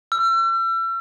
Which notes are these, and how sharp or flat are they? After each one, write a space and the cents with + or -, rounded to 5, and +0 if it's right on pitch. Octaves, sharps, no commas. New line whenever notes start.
E6 +40